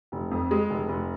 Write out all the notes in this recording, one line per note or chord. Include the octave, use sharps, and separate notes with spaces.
F1
F2
G#3
F1
F1